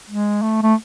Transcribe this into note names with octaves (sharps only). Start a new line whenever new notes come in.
G#3
A3
A3